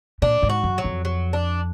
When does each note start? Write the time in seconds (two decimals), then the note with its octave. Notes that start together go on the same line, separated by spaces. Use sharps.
0.22 A#2 D4
0.43 G#2
0.49 F#4
0.64 F#2
0.78 F#3
0.84 F2
1.05 F#3
1.33 D4